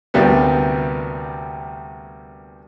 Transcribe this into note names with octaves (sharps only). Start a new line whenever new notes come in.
D2 C3 G3 A#3 B3